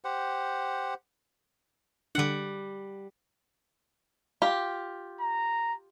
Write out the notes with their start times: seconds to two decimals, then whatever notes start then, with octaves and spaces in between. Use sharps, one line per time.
0.04 G4 C5 F#5
2.15 D3 G3 D4 F#5
4.42 F4 G4
5.21 A#5